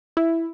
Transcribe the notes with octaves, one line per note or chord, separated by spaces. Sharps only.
E4